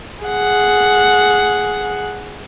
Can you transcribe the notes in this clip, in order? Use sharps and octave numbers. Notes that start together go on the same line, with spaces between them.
G#4 F#5